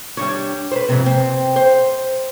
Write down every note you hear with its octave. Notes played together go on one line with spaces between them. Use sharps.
G3 D4 C#5
B4 C5
F2 G#2 C3
C4
C5